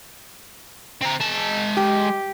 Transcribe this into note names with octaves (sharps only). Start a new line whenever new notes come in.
C4 A#5
G#3 A5
G4